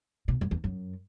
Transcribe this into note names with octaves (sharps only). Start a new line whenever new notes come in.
B2
F#2
E2
F#2